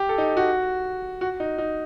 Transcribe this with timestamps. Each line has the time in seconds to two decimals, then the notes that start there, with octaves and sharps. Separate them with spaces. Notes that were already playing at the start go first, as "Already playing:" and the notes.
Already playing: G4
0.09 A4
0.18 D#4
0.37 F#4
1.21 F#4
1.40 D#4
1.58 D#4